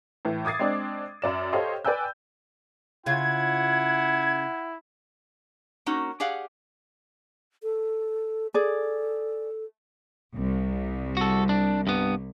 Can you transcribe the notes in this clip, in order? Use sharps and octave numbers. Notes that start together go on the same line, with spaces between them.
A2 E3
D6 D#6 G#6 A6 C7
G#3 C4 D4 D5
F#2 D5 E7
G4 A4 C5 C#5 D#5 F5
B4 D5 G5 G#5 E6 G6
C#3 E4 F4 F#5 G#6
A#3 C#4 D#4 F#4
G4 G#4 D5 F5 F#5
A4
G#4 A4 D5
C2
F#4 A4
D4
G2 B3